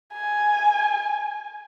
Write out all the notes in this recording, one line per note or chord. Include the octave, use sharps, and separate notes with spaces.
G#5